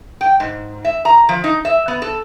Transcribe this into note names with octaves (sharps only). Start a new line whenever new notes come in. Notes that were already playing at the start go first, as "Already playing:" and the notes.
G5
G#2
E5
A#5
F3
D#4
E5
B3
A4